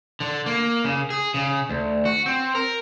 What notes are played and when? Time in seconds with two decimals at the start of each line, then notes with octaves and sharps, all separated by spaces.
0.20 D3
0.46 A#3
0.85 C#3
1.10 G#4
1.34 C#3
1.69 D2
2.05 F#4
2.26 C4
2.55 A#4